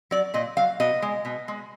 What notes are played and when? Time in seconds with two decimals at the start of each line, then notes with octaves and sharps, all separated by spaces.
0.11 F#3 D5
0.34 A#2 D#5
0.57 F#3 F5
0.80 B2 D#5
1.02 G#3
1.25 B2
1.48 G#3